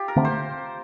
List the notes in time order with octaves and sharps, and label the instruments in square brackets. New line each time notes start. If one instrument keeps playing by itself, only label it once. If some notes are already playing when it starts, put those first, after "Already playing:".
Already playing: [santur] F4 G4
A#4
[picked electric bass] D3 A3 C4
[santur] C5